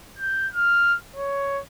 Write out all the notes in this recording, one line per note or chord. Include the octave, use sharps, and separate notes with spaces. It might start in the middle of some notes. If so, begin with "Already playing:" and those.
G6
F6
C#5